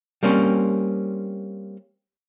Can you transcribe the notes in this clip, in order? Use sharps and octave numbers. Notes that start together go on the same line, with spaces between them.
G3 A#3 C4 C#4